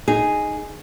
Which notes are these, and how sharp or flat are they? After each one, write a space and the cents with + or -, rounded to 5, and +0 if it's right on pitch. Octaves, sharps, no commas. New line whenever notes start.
D#4 +0 G#4 +0